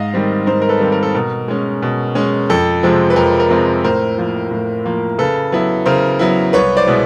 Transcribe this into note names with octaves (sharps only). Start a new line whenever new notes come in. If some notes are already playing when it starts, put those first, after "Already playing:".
Already playing: G#2 D#5 F5
D#3 G3 C4
G#2 A#4 C5
A#4
A4 B4
D#3 G3 C4
A#4
A4
B2 A#4
G#3 C#4
B2
G#3 C#4
F2 A4
C3 F3 G#3 C4
B4
F2 A#4
A#4
C3 F3 G#3 C4
A2 A#4 C5
F3 A#3
A2
F3 A#3
C#3 A4 B4
F#3 B3 E4
C#3 A#4 C5
F#3 B3 E4
C2 B4 C#5
C5 D5
B2 G#3 B3 E4